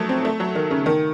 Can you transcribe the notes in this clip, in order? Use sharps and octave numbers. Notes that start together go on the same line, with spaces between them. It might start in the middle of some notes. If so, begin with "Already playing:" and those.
Already playing: F3 F#3 A3
C4
A3
F#3
D#3
C#3
D#3